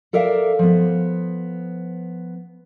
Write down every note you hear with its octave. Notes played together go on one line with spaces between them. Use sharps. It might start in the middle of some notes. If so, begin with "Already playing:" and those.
A4 A#4 D5 E5 F5
F3 B3